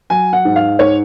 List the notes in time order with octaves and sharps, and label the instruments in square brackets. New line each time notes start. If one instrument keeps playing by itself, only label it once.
[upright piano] F#3 G#5
F#5
G#2
F5
G#2 C#5